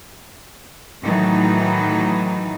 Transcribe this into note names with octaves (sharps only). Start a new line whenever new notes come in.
A2 D#3 E3 F#3 D#4